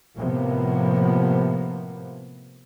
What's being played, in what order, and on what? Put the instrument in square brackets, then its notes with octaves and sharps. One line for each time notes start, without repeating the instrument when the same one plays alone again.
[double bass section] A2 C3 F3 A#3 B3